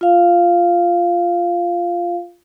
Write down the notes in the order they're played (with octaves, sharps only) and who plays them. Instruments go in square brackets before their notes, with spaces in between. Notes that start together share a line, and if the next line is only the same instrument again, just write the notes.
[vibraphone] F4 F5